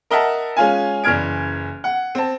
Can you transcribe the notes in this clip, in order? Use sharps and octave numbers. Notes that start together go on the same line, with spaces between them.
A#4 D#5 E5 F#5 A5
G#3 C#4 F4 G#5
F#1 E3 D5 F6 G#6 D7
F#5
C4 A5